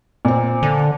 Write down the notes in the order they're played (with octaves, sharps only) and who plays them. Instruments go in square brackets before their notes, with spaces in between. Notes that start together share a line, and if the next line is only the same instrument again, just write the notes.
[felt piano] A#2 C4
[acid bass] D3